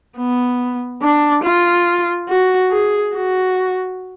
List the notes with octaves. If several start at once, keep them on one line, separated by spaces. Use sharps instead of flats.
B3
D4
F4
F#4
G#4
F#4